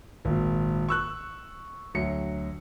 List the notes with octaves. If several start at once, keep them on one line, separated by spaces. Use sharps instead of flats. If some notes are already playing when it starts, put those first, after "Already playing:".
G#1 A#2
C#6 E6 F#6
D2 F#3 C#7